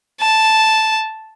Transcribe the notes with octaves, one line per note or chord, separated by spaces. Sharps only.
A5